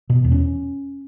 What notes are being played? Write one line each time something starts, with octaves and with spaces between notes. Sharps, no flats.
B2
E2
C#4